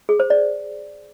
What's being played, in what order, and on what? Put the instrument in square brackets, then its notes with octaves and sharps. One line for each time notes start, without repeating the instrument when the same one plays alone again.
[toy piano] G#4
C5
D5